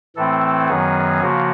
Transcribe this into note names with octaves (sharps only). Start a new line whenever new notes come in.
A2 E3 A3 C4 E4 A4
F#2 D#3 F#3 B3 G#4
C#3 F3 A#3 F#4